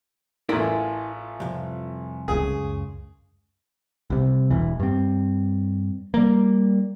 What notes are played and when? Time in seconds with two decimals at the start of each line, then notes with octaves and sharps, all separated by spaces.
0.49 A1 A2 E4 F4 A#4 D5 G#5 C6
1.40 C2 F2
2.28 C#2 F#2 C#3 G#4
4.10 C2 C3
4.51 E1 E3
4.80 G2 C4
6.14 G3 A#3